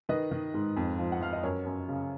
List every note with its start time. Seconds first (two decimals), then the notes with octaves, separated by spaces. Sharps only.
0.09 D#3 B4 D#5
0.31 D#3
0.54 G#2
0.76 F2
0.98 F3
1.12 F#5
1.21 F3 F5
1.33 D#5
1.43 F#2 A#4 C#5
1.66 F#2
1.88 C#3